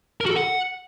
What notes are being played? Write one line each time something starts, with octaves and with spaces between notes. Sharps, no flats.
A#4
F#4
A4
F#5